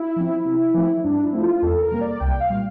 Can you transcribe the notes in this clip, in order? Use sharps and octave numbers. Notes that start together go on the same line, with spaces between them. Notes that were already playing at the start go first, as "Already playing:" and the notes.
Already playing: E4
F3 C4
C3
F3 A3 C4
G2 D4
E4
F3 A3 C4
F4
E2 A4
A#4
C3 G3 A#3
D5
C2 G5
F5
A#2 G3